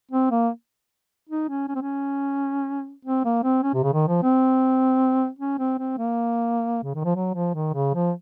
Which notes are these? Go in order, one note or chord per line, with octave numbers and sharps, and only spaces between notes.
C4
A#3
D#4
C#4
C#4
C4
C#4
C4
A#3
C4
C#4
C3
C#3
D#3
F3
C4
C#4
C4
C4
A#3
C#3
D#3
F3
F#3
F3
D#3
C#3
F3